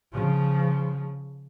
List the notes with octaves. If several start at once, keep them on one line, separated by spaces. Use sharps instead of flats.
C#3 F3